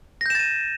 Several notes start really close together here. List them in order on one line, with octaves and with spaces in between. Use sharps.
A#6 G6 E7 A6 D#7